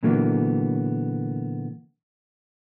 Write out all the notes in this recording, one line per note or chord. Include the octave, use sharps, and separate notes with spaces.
A#2 D3 E3 F#3 A#3 B3